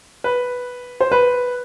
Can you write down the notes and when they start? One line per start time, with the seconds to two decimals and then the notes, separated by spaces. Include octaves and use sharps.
0.24 B4
1.01 C5
1.12 B4